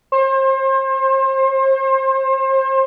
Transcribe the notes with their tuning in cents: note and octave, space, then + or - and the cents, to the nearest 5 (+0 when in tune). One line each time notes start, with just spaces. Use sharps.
C5 +35